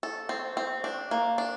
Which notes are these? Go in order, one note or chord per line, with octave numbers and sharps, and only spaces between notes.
A4
C4
C4
D4
A#3
D4